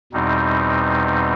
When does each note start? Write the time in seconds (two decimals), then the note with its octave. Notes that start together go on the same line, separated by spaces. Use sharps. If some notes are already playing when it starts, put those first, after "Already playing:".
0.13 E2 B2 G3 C4 D#4